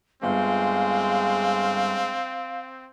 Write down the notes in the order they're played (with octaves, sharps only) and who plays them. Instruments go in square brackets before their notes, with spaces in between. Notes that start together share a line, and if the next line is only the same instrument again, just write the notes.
[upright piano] G1 [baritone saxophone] G#3 [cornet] C4 [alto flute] F5